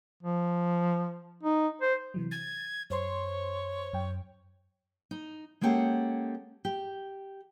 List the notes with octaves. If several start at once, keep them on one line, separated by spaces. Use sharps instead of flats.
F3
D#4
C5
C3 E3 F#3
G#6 A6
F#2 C5 C#5 C6
F#2 G5
D#4
G#3 A#3 C#4 G4 A4 F#5
G4